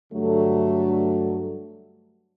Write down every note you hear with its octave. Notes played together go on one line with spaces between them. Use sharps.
G2 D3 F#3 A3